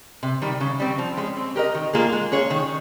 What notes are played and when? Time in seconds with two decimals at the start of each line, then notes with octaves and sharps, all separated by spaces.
0.23 C3
0.42 D#3 G3
0.60 C#3
0.80 G3 C4
0.98 F3
1.17 G#3 C#4
1.37 C4
1.55 G4 A#4 D#5
1.75 D#3
1.93 A#3 F4 G#4
2.12 G#3
2.32 C#4 G#4 C#5
2.50 D#3